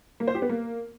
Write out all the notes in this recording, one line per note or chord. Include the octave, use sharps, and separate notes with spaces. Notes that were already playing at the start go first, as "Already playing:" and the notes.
A#3
C5
G4
B3
A#3